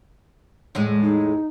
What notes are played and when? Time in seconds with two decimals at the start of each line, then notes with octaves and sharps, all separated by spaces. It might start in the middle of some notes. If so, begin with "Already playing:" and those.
0.75 E2 A2 G#3
1.02 D#4